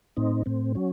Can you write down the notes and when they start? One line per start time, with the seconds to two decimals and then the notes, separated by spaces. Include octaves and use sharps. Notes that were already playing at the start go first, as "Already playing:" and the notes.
0.17 A2 C4 D#4
0.46 A2 C4
0.75 F#3 C#4